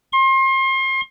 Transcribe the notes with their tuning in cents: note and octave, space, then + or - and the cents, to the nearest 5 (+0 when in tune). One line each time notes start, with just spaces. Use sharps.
C6 +35